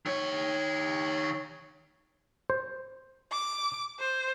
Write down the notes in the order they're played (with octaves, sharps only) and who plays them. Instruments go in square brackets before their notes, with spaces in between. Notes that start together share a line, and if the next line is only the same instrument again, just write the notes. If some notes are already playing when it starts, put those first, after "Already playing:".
[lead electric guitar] D#3 C#5
[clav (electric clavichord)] C5
[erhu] D6
C5